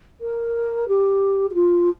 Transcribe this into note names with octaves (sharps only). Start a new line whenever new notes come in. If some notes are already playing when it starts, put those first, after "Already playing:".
A#4
G4
G4
F4